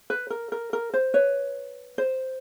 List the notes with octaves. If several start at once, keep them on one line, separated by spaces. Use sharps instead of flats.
B4
A#4
A#4
A#4
C5
B4 C#5
C5